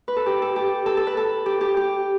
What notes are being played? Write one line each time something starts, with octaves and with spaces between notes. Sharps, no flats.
B4
A4
G4
A4
G4
A4
A4
B4
A4
G4
G4
G4